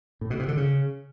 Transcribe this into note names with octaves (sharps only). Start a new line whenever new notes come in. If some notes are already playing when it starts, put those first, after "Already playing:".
A2
B2
C3
D3
C#3